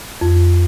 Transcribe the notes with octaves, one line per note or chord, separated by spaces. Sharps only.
F2